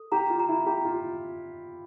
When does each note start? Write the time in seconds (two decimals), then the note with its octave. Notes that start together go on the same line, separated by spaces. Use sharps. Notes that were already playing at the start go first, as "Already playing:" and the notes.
Already playing: A4
0.12 G4 A#5
0.30 F4
0.39 A#5
0.49 E4
0.67 G4 A#5
0.85 F4